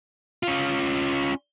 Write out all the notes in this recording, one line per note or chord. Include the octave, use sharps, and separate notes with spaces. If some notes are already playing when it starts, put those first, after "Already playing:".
C#4 F4